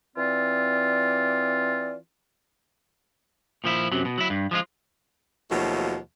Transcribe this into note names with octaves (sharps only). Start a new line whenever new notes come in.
E3 C4 F4 D5
A#2 F3 E4
F#2 C3 F#3
B2
F#3 E4
G2
F3 G#3 F4
D#2 B2 F3 F#3 A3